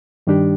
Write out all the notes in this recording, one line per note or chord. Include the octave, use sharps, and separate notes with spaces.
G2 D#3 G3 D4 G4